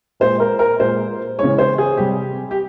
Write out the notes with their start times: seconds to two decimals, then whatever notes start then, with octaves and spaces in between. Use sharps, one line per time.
0.20 A#2 G#3 C5
0.40 A#4
0.59 A#4
0.80 A#2 G#3 C5
1.38 C#3 E3 G#3 C#5
1.58 C5
1.78 G#4
1.97 C3 G3 G4
2.51 G4